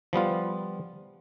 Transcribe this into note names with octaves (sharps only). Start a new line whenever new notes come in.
F3 G3 B3 F4